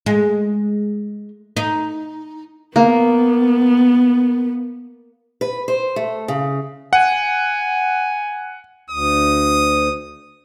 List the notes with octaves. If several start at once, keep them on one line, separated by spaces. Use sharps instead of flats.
G#3
D#4
A#3 B3
B4
C5
A3
C#3
F#5 G#5
D2 D#6